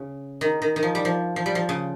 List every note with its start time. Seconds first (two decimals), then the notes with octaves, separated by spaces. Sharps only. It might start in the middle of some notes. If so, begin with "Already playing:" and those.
Already playing: C#3
0.41 D#3
0.62 D#3
0.76 D#3
0.83 F3
0.95 G3
1.05 F3
1.36 F3
1.46 G3
1.55 F3
1.69 C#3